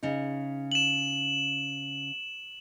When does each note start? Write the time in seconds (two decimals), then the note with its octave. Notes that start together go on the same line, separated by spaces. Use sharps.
0.03 C#3 D#4
0.72 E7 F#7